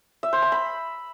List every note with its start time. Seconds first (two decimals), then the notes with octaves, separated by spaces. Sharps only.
0.23 E5
0.33 C5
0.42 A#5
0.52 B5